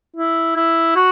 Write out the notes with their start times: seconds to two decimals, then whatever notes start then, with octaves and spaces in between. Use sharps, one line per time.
0.16 E4
0.56 E4
0.96 F#4